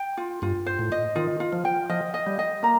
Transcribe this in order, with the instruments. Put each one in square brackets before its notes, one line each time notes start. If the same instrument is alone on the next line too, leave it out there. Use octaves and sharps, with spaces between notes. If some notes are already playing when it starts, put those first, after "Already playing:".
Already playing: [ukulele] G5
F4
[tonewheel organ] G2 [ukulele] F4
[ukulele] C5
[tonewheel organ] A2
[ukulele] D#5
[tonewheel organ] D#3 [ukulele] F4
[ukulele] F4
[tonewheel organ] F3
[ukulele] G5
[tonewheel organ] F3 [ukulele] D#5
[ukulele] D#5
[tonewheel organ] G3
[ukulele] D#5
[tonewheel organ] A#3 [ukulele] A#5